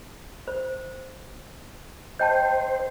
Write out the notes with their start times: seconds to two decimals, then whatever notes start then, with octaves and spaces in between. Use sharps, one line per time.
0.48 C5
2.20 C5 D#5 G5 A5